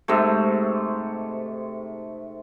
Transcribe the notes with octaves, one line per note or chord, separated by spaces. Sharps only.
G#2 C3 A3